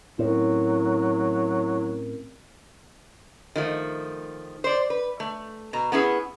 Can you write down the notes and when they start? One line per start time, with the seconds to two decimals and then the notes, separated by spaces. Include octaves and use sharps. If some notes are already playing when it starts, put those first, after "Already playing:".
0.19 A2 F#3 C4 C#4 E4 A#4
3.56 D#3 F3 A3
4.64 C5 D5
4.90 B4
5.20 A3
5.73 B2 A#5
5.92 B3 C#4 E4 G#4